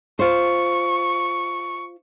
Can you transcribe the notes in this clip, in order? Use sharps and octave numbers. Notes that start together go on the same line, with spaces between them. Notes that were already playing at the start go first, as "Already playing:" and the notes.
F4 C5 C#6